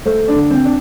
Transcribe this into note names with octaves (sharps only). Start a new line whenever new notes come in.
A3 C5
D4
D3
C4
D4